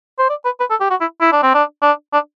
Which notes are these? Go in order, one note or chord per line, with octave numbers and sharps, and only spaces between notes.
C5
D5
B4
B4
A4
G4
F#4
E4
E4
D4
C4
D4
D4
D4